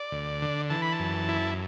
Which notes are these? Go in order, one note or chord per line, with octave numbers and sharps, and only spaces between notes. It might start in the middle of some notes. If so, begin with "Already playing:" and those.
Already playing: D5
D2
D3
E3 A5
B5
A5
F#2
E4